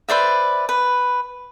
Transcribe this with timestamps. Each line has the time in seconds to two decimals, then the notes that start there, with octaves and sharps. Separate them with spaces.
0.09 B4 C5 D5 E5
0.69 B4